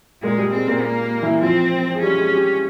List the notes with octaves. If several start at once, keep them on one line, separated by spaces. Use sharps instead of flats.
A#2 G#3 A#3
G3
G#3 C4
A#2 A#3
A#3
E3 E4
F3 C4 F4
G#4
G3 C#4 G4
G#3 G#4
G3 G4